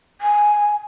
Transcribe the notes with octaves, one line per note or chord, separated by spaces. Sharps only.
G#5